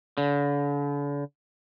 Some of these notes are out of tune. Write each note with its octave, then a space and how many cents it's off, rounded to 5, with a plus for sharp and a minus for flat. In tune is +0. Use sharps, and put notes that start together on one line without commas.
D3 -40